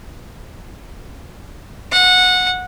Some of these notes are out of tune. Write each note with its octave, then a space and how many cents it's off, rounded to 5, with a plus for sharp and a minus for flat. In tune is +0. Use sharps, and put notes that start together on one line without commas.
F#5 -20